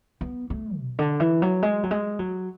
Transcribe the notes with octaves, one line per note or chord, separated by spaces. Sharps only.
B3
A3
B2
D3
E3
F#3
G#3
F#3
G#3
F#3